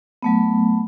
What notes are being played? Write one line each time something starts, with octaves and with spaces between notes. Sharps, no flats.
F#3 A3 B3